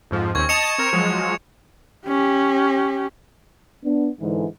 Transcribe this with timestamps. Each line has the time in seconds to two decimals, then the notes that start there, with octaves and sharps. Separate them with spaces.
0.11 F2 G#2 F3
0.35 D#2 C4 C#4 C#6 G#6
0.49 D#5 A5 C#7 E7 F7
0.78 C4 A#4
0.93 F3 F#3 G#3
2.07 C#4 G4
3.84 B3 D4
4.20 G#2 D3 E3